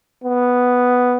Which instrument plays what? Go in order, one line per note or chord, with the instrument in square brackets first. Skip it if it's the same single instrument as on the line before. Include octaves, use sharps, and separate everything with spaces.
[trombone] B3